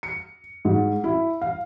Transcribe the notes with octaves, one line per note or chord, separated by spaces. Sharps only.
C#7
G#2
E4
F5